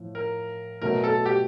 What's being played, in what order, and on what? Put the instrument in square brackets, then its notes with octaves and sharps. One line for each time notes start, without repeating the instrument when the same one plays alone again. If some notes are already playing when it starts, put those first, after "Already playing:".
Already playing: [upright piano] A2 F3
[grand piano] A#4
[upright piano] B2 F#3 A3 [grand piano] A#4
[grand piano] A4
G4